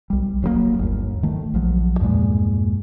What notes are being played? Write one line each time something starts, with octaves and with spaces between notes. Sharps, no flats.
B1 G3
D#1 F#3 G3 A#3
G1 D#2
D#3 A3
A#1 F3 F#3
E2 G2 A#2 G#3